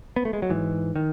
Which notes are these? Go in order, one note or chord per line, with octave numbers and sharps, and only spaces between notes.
B3
A3
G#3
F#3
G#2 E3
D#3